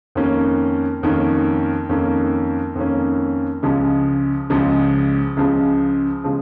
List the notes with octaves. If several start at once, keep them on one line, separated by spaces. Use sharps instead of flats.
F2 D#3 A#3 C#4
F2 D#3 A#3 C#4
F2 D#3 A#3 C#4
F2 D#3 A#3 C#4
C#2 C#3 F3 G#3
C#2 C#3 F3 G#3
C#2 C#3 F3 G#3
C#3 F3 G#3